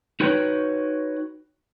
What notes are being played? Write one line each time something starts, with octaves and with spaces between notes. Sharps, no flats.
D#4 F#4 B4 C#5 G5